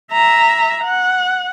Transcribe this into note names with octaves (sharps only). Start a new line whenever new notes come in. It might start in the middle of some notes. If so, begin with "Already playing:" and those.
E5 A#5
F#5